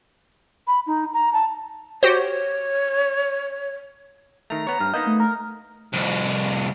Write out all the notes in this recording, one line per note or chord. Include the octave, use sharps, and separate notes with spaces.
B5
D#4
A#5
A5
F#4 G4 C5 C#5
D#3 A3 A#5
B3 C#5
G2 F6
A#3 B3 D#4 D#5 G6
A3
A#4
C2 F2